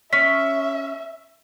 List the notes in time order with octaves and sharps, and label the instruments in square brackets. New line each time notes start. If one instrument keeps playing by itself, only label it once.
[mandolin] C#4 [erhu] E5 [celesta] B6